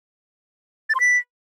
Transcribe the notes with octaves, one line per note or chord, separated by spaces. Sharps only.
A6
C6
B6